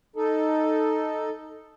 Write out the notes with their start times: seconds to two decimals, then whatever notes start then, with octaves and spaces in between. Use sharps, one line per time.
0.16 D#4 A4